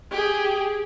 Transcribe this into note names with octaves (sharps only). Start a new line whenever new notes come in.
G4 G#4